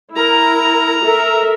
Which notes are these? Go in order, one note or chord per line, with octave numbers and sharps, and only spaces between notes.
E4 A#4 A#5
A4 A#4 E5